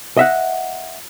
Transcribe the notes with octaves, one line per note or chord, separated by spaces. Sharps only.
D#5 E5 F#5